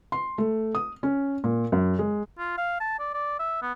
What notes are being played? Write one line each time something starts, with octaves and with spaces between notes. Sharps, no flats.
C6
A3
D#6
C#4
A#2
F#2
G#3
F4
F5
A5
D5
D5
E5
B3